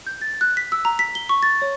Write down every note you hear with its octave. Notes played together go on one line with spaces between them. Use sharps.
G6
A6
F#6
B6
E6
A#5
B6
G7
C#6
A6
C#5